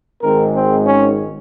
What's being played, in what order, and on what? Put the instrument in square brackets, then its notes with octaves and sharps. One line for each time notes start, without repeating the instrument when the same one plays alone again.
[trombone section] G#1 G#2 D#3 G#3 C4 A#4
C4
C#4